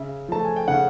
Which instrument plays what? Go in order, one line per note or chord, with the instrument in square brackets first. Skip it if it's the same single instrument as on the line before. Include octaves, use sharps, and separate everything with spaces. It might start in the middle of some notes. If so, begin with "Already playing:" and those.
Already playing: [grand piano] C#3 E5
F3 A3 A5
G#5
G5
C#3 F#5